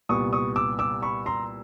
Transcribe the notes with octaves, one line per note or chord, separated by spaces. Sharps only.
C2 A#2 G3 B3 C#6 D#6
C#6 D#6
D6 E6
D6 E6
B5 C#6
A#5 C6